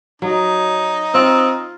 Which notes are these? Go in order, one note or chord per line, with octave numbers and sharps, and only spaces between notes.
F#3 D#4
C4 F4